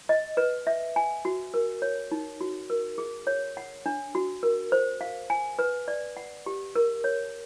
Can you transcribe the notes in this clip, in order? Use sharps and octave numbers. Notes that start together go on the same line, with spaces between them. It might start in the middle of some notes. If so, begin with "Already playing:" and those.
D#5
B4
E5
G#5
F#4
A#4
C#5
D#4
F#4
A#4
G#4
C#5
F#5
D4
F#4
A#4
C5
F5
G#5
B4
D5
F#5
G4
A#4
C#5